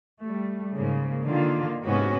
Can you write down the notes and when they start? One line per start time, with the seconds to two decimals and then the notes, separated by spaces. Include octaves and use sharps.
0.22 G3 A3
0.77 G#2 C#3 A#3
1.26 D3 D#3 A#3 F4
1.85 G#2 C3 B3 C#4 F#4